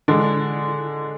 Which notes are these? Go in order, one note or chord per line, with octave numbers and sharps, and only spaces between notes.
D3 G#3 D4